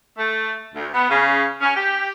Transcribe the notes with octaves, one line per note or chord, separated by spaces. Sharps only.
A3
D2
B3
C#3
C#4
G4